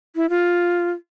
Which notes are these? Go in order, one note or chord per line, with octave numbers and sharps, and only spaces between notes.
E4
F4